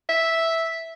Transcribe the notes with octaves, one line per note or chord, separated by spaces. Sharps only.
E5